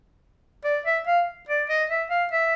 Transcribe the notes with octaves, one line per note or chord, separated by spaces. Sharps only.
D5
E5
F5
D5
D#5
E5
F5
E5